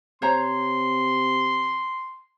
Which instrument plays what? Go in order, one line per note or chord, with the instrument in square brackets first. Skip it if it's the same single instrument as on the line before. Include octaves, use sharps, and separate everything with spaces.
[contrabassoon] C3 [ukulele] C5 C#5 A#5 [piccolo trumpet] C6